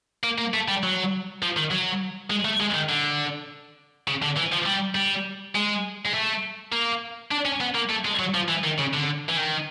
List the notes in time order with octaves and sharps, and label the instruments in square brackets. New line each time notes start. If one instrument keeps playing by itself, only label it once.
[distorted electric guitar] A#3
A#3
A3
G3
F#3
F3
D#3
F#3
G#3
A3
G#3
D#3
D3
C#3
D3
E3
F3
G3
G3
G#3
G#3
A3
A#3
D4
C#4
B3
A#3
A3
G#3
F#3
F3
E3
D#3
C#3
D3
E3
D#3